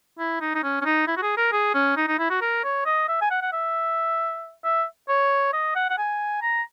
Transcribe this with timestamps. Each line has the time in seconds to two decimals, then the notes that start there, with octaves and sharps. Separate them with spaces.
0.19 E4
0.41 D#4
0.55 D#4
0.63 C#4
0.81 C#4
0.85 D#4
1.07 E4
1.17 F#4
1.22 G#4
1.37 A#4
1.52 G#4
1.74 C#4
1.97 D#4
2.08 D#4
2.19 E4
2.30 F#4
2.42 A#4
2.64 C#5
2.86 D#5
3.08 E5
3.21 G#5
3.31 F#5
3.42 F#5
3.53 E5
4.64 E5
5.09 C#5
5.53 D#5
5.75 F#5
5.90 F#5
5.98 G#5
6.42 A#5